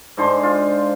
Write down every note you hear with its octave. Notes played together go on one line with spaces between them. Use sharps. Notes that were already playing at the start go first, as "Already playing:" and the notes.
G#2 D3 C5 G#5
F4